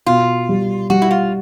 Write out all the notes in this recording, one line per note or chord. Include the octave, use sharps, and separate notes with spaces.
B2 F4
G3
G3 F#4
E4
F4